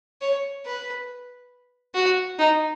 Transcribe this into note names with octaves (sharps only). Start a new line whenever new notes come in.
C#5
B4
F#4
D#4